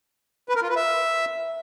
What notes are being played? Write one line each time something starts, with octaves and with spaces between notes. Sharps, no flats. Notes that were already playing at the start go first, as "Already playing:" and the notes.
B4
A#4
F4
B4
E5